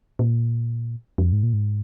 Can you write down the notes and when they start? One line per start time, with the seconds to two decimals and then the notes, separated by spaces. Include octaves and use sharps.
0.19 A#2
1.18 F2
1.32 G#2
1.43 A#2
1.53 G#2